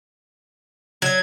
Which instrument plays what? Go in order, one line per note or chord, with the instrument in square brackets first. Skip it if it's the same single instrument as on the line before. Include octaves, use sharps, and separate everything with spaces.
[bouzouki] F#3 [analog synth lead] G#6